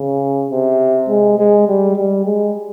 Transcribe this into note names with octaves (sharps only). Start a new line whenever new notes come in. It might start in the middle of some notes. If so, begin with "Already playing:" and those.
Already playing: C#3
C3
G#3
G#3
G3
G3
G#3